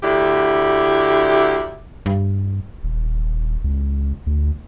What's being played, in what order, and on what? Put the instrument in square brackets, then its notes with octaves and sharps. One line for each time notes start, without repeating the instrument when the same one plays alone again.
[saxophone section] D2 D3 E4 G4
[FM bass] G2
[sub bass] D#1
C#2
D2